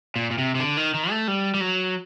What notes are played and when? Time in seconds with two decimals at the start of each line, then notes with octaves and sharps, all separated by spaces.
0.16 A#2
0.31 A#2
0.38 C3
0.55 C3
0.60 D3
0.77 D#3
0.94 D#3
1.10 A3
1.28 G3
1.54 G3
1.61 F#3